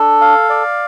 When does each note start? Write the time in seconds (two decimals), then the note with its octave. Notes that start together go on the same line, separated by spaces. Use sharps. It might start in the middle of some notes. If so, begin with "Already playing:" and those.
Already playing: D4 A4
0.21 F5
0.49 D5